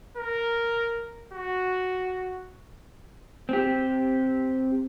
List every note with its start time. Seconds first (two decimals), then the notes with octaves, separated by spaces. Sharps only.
0.17 A#4
1.33 F#4
3.49 C4 G4